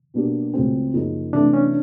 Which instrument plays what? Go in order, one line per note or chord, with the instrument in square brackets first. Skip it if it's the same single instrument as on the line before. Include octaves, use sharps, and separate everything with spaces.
[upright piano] B2 F#3 A#3 D4 G4
C#2 C#3 F#3 A3 C4
F#2 C#3 F3 A#3 D#4
[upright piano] C3 E3 A3 [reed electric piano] D4
[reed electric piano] C#4